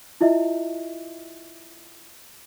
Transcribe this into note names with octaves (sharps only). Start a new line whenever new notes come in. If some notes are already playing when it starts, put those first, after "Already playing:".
E4 F4 D#5 E5